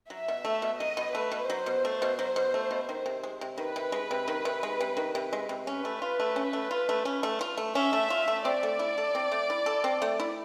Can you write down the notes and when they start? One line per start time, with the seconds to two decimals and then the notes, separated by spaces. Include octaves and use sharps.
0.10 F#3 E5
0.28 B2
0.45 A3
0.62 B2
0.80 F#3 D#5
0.97 B2
1.15 A3 B4
1.32 B2
1.49 F#3 C5
1.66 B2
1.85 A3
2.02 B2
2.19 F#3
2.36 B2
2.54 A3
2.71 B2
2.89 D#3
3.06 C3
3.24 G#3
3.41 C3
3.58 D#3 B4
3.76 C3
3.92 G#3
4.11 C3
4.28 D#3
4.45 C3
4.63 G#3
4.80 C3
4.97 D#3
5.15 C3
5.33 G#3
5.49 C3
5.66 C#4 B4
5.85 A3
6.02 F4
6.20 A3
6.36 C#4
6.53 A3
6.71 F4
6.89 A3
7.05 C#4
7.23 A3
7.41 F4
7.58 A3
7.75 C#4 E5
7.93 A3
8.10 F4
8.28 A3
8.45 C4 D5
8.63 A3
8.79 E4
8.98 A4
9.15 C4
9.32 A3
9.50 E4
9.66 A4
9.84 C4
10.02 A3
10.20 E4